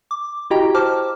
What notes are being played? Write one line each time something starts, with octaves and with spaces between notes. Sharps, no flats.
D6
E4 F#4 G4 D#5 G5 A#5
C5 A5 D6 F6